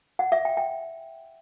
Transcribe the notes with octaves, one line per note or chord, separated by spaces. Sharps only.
F#5
E5
G5
G5